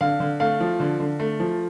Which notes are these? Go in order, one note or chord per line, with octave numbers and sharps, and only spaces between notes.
D3 F5
D3
A3 F5
F3
D3
D3
A3
F3